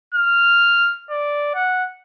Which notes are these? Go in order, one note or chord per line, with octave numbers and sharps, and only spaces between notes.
F6
D5
F#5